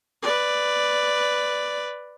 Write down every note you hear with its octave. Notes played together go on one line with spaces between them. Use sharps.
B4 D5